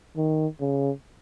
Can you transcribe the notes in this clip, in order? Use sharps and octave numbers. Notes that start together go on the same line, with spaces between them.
D#3
C#3